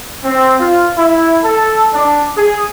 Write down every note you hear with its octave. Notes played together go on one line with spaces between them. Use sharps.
C4
F4
E4
A4
D4
G#4